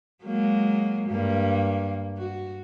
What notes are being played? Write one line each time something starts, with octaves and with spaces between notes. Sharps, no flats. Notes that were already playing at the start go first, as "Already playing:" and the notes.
F#3 G#3 A#3
G2 A#3
F#4